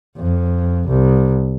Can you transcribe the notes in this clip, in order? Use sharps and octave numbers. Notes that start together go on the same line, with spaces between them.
F2
C2